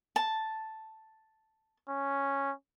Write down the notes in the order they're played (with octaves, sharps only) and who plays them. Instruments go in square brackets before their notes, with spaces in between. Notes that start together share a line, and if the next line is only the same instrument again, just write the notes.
[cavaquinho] A5
[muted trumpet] C#4